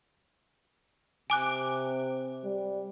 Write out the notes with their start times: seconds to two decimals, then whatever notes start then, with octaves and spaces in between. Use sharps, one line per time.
1.30 C3 G#5 D6 F#6
2.44 G3